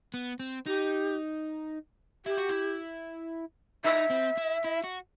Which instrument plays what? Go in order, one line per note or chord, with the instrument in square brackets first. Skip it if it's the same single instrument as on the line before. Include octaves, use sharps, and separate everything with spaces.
[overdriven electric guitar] B3
C4
[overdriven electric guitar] D#4 [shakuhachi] G4
[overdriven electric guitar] E4 [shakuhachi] G4
[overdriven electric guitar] F#4
E4
[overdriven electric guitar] D#4 [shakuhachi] E5
[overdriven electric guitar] C4
E4
E4
F#4